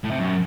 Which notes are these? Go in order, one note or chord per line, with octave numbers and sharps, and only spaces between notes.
A2
C3
F#2